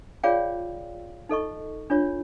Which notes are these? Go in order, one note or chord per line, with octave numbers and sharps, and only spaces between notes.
F4 G#4 C#5 D5 F5 G5
D#4 A4 D#5 C#6
D4 F4 C#5